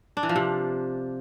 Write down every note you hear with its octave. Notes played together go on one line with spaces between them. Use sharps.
D4
E3
F3
C3